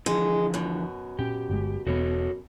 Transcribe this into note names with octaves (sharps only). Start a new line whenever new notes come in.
D3 E3 F3 G#3
F#2 B2
A#2 C#4 G4
G1 G#3
E1 B3 F#4 A4 C#5